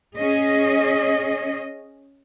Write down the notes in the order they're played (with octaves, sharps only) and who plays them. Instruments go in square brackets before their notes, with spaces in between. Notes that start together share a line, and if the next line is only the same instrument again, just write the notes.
[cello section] C#4 G#4 D#5